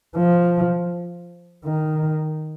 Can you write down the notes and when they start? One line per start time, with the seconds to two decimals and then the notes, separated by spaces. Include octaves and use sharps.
0.17 F3
1.65 D#3